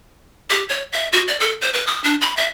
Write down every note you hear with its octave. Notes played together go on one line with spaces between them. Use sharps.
G4
C#5
E5
F#4
D5
A4
C5
B4
D#6
D4
B5
E5